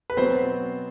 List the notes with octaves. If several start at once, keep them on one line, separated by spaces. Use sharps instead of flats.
B4
B2 F#3 B3 C4 C5